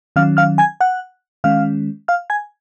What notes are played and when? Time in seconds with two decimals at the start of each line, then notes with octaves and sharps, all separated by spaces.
0.16 D#3 F#3 C#4 F5 F6
0.37 F5 F6
0.58 G#5 G#6
0.81 F#5 F#6
1.44 D#3 G#3 C#4 F5 F6
2.08 F5 F6
2.30 G#5 G#6